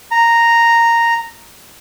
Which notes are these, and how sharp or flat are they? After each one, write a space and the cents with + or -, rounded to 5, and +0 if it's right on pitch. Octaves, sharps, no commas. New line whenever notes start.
A#5 -5